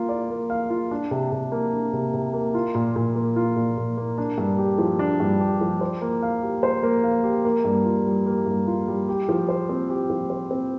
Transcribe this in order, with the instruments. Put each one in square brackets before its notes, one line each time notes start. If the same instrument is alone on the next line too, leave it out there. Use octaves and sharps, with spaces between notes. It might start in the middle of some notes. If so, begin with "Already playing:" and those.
Already playing: [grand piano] A#3 F4 F5
D5
A#3
F5
F4
D4
C3
C3
A#3
D4
C3
C3
A#3
F4
A#2
A#2
A#3
F4
A#2
A#2
A#3
D4
G2
G4
F3
D4
G2
G4
F3
C5
A#3
F5
G4
C5
A#3
F5
G4
A#3
G2
F4
G3
A#3
G2
F4
G3
G4
F3
C5
C4
G4
F3
C5
C4